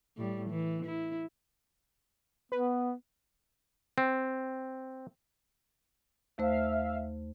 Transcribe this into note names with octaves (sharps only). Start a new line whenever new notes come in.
A2 G3
E3
E4
B3 B4
C4
D#2 A3 C5 E5 F5